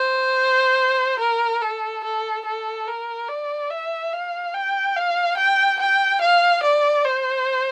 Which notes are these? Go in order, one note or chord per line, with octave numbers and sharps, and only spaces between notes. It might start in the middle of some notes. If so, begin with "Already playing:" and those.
Already playing: C5
A#4
A4
A4
A4
A#4
D5
E5
F5
G5
F5
G5
G5
F5
D5
C5